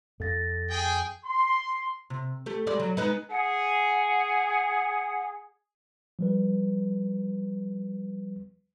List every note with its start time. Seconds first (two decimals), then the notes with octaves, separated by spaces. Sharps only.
0.20 F2 A4 A6 A#6
0.70 G#4 G5
1.24 C6
2.10 C3
2.46 A3 G4
2.67 G3 G#3 D5
2.80 F#3
2.97 G#3 B3 D#4
3.30 G#4 F#5
6.19 F3 G3 B4